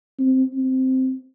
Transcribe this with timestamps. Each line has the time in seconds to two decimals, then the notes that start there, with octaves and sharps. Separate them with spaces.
0.19 C4
0.54 C4